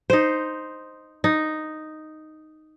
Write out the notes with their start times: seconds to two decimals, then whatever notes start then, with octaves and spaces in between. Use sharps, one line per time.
0.10 D#4 C5
1.24 D#4